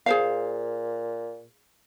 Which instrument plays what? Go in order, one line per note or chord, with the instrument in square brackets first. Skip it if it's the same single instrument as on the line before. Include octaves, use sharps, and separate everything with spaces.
[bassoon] A#2 [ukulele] G#4 C5 F5